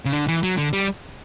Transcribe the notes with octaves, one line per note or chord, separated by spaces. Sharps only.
C#3
D3
E3
F#3
D3
G3